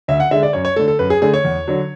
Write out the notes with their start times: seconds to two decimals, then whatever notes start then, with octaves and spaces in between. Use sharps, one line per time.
0.08 D2 E5
0.20 F#5
0.31 D3 G#3 E5
0.43 D5
0.53 F#2 C#5
0.65 C#5
0.76 D3 A3 A4
0.88 A4
0.99 F#2 B4
1.10 G#4
1.21 D3 A3 G#4
1.34 C#5
1.45 E2
1.68 D3 F#3